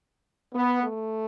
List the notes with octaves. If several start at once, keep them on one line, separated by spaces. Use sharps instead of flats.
B3
A3